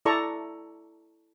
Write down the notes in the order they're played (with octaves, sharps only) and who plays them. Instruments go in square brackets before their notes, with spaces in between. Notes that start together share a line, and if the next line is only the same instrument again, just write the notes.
[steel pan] E4 A4 D5 A#5 C#6